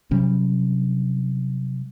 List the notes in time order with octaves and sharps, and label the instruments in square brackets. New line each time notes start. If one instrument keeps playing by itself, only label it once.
[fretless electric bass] C3 F#3 G3 C#4